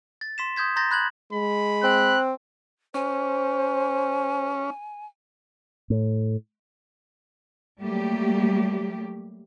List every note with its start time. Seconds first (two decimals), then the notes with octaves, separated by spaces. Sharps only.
0.21 A6
0.38 C6 B6 E7
0.56 C6 D#6 G6 G#6 B6
0.76 A#5 C6 G6 A6 A#6
0.91 B5 F#6 G#6 F#7
1.32 G#3 B5
1.84 C4 F#6
2.94 C#4 C5 G#5
5.90 A2
7.82 F#3 G3 A3 A#3 G4